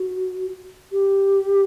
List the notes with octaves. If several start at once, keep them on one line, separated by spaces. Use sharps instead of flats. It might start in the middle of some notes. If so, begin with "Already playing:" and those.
Already playing: F#4
G4